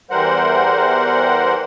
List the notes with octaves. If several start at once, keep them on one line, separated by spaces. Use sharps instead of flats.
E2 E3 G3 A#4 C5 F#5